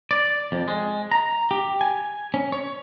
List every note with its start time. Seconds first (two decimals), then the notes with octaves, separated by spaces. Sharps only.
0.11 D5
0.52 F2
0.68 G#3
1.11 A#5
1.51 G4
1.81 G#5
2.34 C#4
2.52 C#5